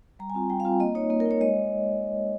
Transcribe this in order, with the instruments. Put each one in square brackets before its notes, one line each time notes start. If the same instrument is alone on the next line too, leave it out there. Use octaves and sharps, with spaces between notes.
[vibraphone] G3 A#5
G#5
C4 F4
G3 G5
F5
C4 F4
A#3 D#5
D#4 C#5
A#3
A#4
D#4
C#5
G#3 D#5